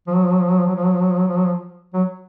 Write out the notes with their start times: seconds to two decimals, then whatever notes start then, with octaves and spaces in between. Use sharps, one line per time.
0.07 F3
0.15 F#3
0.24 F3
0.32 F#3
0.41 F3
0.50 F#3
0.58 F3
0.67 F#3
0.76 F3
0.85 F#3
0.94 F3
1.02 F#3
1.11 F3
1.19 F#3
1.28 F3
1.37 F#3
1.45 F3
1.94 F#3